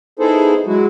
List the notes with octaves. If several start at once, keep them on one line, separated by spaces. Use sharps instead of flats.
B3 D#4 E4 G#4 A4 C5
F#3 G#3 E4 F#4